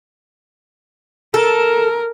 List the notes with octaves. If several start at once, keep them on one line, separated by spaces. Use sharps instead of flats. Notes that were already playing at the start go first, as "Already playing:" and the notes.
A4 A#4